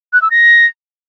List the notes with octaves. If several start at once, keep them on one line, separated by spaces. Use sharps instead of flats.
F#6
E6
A#6